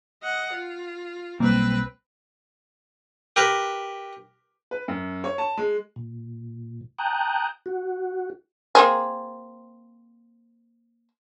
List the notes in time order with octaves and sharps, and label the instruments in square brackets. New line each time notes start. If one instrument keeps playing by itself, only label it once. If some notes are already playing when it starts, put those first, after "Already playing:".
[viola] D#5 F#5
F4
[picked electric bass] B1 G3 A#3 [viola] C4 B4
[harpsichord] G4 A#4 B4
[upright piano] B4
F#2
C#5
A5
G#3
[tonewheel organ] A#2
G5 A5 A#5 D#6 F#6 G6
F#4
[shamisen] A#3 C4 G#4